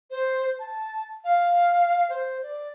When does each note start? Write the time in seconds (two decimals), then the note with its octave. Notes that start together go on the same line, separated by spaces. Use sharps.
0.10 C5
0.59 A5
1.24 F5
2.10 C5
2.43 D5